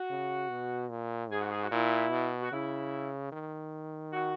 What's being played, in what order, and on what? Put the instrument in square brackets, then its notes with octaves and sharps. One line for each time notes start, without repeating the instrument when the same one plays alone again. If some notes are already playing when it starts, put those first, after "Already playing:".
Already playing: [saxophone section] F#4
[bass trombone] C#3
B2
A#2
[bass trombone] G#2 [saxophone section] G#4
[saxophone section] F#4
G#4
F#4
[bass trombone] A#2 [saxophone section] E4
[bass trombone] B2
[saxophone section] F#4
[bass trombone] C#3 [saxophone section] E4
[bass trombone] D#3
[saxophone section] F#4